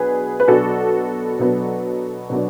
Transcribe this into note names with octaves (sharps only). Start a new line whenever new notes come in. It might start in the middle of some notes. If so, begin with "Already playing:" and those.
Already playing: B2 F#3 B3 D4 G#4 B4
B4
B2 F#3 B3 D4 F#4 A4
B2 F#3 B3 D4
B2 F#3 B3 D4